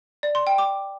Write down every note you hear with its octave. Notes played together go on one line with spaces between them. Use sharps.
D5
C6
G5
D6